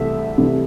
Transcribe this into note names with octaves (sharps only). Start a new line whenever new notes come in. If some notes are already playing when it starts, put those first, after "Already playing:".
Already playing: C2 C3 E3 A3 E5
C2 C3 E3 A3